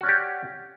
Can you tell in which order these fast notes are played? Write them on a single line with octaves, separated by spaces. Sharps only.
F#4 C#4 D5 G4